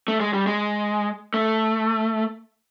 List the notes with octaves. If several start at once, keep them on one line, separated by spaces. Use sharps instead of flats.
A3
G#3
G3
G#3
A3